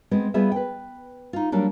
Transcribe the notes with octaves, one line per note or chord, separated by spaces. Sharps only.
G#3 B3 C4
G3 B3 F4 G#4 E5
B4 G5
D#4 F4
F#3 G3 A#3 D4